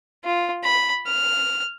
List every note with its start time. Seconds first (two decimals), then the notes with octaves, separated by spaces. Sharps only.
0.25 F4
0.64 B5
1.06 F6